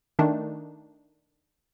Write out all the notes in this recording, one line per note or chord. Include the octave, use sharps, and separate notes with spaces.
D#3 A3 D4 D#4